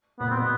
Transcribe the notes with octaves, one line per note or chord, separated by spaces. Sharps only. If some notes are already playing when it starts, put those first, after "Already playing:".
A#2 B3
B2 C4
B3